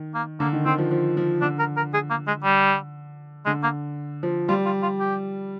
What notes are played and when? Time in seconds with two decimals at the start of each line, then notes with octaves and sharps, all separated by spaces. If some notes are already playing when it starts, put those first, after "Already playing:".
Already playing: D#3
0.14 A#3
0.40 D3 A#3
0.53 D#3
0.66 D#3 C4
0.78 F3
0.91 F3
1.17 F3
1.42 D3 D4
1.59 A#4
1.77 A#4
1.94 G#4
2.11 A#3
2.27 G#3
2.44 G3
3.46 D3 G#3
3.63 A#3
4.23 F3
4.49 G3 F4
4.66 F4
4.83 F4
5.00 G4